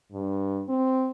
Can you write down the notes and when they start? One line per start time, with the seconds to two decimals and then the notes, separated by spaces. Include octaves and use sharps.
0.12 G2
0.69 C4